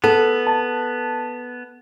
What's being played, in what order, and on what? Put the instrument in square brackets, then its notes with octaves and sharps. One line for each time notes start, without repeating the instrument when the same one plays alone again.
[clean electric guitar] B3 [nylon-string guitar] A4
[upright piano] A5